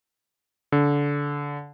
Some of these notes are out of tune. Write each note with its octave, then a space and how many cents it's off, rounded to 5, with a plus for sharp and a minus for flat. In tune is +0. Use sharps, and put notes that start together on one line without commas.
D3 -25